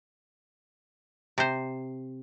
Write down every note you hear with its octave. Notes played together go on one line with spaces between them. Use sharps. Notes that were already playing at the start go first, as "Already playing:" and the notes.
C3 C5